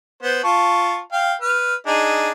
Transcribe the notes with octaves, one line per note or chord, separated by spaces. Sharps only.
B3 C5
F4 A5 C#6
F5 G5
B4 F6
D4 D#4 G#4